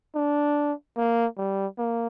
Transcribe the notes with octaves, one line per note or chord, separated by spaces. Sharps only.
D4
A#3
G3
A#3